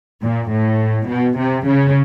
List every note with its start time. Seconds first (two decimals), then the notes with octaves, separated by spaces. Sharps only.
0.22 A#2
0.51 A2
1.08 B2
1.37 C3
1.66 C#3